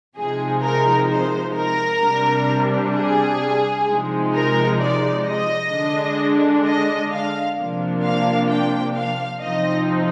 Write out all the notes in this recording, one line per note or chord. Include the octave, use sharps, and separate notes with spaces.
C3 F3 G#3 D#4 G#4
A#4
C5
A#4
C3 G3 D4
G#4
C3 F3 G#3 D#4
A#4
D5
D#5
D3 G#3 D4
D#5
F5
C3 F3 A#3 D4
F5
G5
F5
C3 F3 C4 D#4 D#5